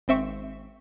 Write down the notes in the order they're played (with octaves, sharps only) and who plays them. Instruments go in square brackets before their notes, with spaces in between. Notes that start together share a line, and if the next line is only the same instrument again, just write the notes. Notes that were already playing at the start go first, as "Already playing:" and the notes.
[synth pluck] G#1 C4 E5 C#6